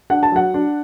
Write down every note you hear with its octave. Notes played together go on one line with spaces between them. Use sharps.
D4 F#5
A5
F#3 F#5
D4